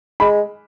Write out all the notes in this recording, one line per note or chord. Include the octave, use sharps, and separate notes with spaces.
G#3 B5